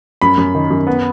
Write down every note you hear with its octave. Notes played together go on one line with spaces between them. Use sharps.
F#2 B5
F#2
D#3
F#2
B3